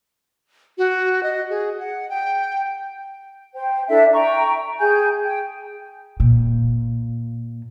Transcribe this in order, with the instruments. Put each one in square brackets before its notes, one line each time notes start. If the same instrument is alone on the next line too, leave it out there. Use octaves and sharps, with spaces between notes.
[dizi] F#4
D#5
G#4
F#5
G5
[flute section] C5 G5
D4 E4 A4 E5
G5 A#5 C#6
G#4 G5 G#5 G6
G5
[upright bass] A#2